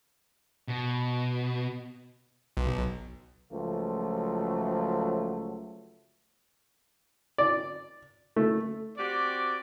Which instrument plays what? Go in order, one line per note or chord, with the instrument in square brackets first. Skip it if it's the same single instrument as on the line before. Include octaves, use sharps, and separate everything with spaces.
[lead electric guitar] B2
[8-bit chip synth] B1
[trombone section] C#2 F3 F#3 A3
[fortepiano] D5
A3
[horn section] C4 F#4 G4 D5